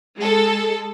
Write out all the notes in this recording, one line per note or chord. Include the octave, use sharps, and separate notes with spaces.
G#3 A4